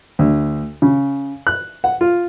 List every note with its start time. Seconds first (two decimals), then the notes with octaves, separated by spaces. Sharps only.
0.19 D2
0.82 C#3
1.47 F#6
1.84 F#5
2.01 F4